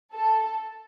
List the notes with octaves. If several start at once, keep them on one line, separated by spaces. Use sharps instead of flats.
A4